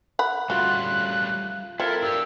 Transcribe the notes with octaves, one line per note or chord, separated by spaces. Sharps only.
F#5 B5
G3 A3 C#4 F4 F#4 F#6
C4 E4 F4 A4 A#4 F6
D4 G4 E6